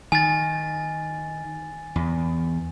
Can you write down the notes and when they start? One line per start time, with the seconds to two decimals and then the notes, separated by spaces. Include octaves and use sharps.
0.12 D#3 G#5 A6
1.96 E2